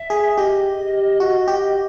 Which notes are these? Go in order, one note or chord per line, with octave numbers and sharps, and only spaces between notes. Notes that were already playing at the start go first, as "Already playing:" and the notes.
Already playing: E5
G#4
G4 D#5
F#4
G4